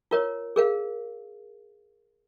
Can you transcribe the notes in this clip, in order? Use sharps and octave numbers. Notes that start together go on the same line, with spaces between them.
F4 A#4 C#5
G#4 A#4 F5